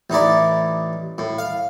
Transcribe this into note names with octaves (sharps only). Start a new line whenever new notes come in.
A1 D#4 E4 D5
A2
F5